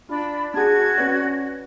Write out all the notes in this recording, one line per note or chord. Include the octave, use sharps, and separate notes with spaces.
D4 F4 B5
D4 F#4 G#4 G#6
C#4 B4 D5